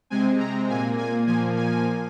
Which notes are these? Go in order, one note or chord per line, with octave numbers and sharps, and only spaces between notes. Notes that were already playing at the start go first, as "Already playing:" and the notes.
C3 G#3 C4 G#5
A#5
A#2 A#3 G#5
G#5
A#2 F3 A#3 G#5
G#5